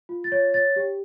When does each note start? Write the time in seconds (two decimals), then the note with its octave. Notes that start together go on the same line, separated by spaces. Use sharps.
0.09 F4
0.24 A6
0.32 C#5
0.54 C#5 A6
0.76 G4